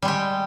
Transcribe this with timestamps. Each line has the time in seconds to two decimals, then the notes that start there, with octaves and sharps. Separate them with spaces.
0.02 G3
0.05 G#3
0.08 G4